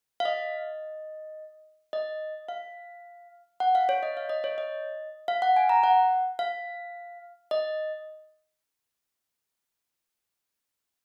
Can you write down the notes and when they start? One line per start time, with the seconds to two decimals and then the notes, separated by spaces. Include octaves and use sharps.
0.20 F5
0.25 D#5
1.93 D#5
2.48 F5
3.60 F#5
3.75 F5
3.89 C#5
4.03 D#5
4.17 F5
4.29 D#5
4.44 C#5
4.58 D#5
5.28 F5
5.42 F#5
5.56 G#5
5.69 A#5
5.84 F#5
6.39 F5
7.51 D#5